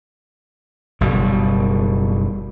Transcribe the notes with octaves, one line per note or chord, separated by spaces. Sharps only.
F#1 B2 G3